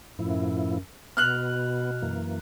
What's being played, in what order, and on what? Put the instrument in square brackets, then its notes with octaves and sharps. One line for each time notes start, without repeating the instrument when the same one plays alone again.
[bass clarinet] F#2 [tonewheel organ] A2 F3 E4
[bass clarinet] B2 [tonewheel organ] B3 [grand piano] F6 F#6 F#7
[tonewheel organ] F#2 E3 A#3